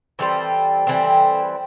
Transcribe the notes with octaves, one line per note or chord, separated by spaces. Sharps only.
E3 G3 C4 A4
E3 G3 C4